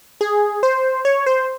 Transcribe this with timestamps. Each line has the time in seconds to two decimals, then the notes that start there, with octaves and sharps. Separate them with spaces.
0.21 G#4
0.63 C5
1.05 C#5
1.26 C5